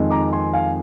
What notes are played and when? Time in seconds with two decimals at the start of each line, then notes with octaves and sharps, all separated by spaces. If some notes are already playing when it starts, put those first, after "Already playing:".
Already playing: F2 D#3 G#3 C4
0.11 A#5 D6
0.33 G#5 C6
0.53 F5 G#5